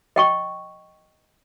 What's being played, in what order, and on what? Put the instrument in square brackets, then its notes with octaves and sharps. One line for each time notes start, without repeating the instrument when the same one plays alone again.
[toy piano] D#5 G5 C#6